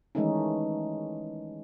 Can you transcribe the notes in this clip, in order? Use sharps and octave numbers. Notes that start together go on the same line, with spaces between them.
D#3 E3 G#3 A3 C#4 D#4